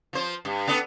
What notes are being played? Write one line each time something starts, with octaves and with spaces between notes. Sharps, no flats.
F3 C5
G2
B3 D4 A4